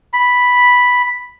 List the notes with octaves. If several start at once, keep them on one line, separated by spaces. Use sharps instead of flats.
B5